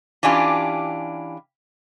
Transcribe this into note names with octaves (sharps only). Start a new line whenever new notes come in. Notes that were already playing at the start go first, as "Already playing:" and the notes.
E3 C#4 D4 F4 G4